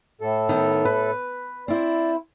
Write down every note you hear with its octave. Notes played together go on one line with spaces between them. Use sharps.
A2 A4
D#3 B3
B4
C4 E4 C5 D5